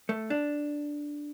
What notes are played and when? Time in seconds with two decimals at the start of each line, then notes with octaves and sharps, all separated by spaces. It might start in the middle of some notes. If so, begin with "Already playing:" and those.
0.09 A3
0.30 D4